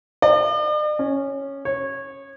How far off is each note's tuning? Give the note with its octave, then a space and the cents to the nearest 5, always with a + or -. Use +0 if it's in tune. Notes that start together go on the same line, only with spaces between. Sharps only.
D5 +45
C#4 -5
C#5 -20